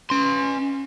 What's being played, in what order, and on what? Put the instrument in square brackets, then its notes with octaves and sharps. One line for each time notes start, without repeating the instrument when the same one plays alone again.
[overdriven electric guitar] C#4 C6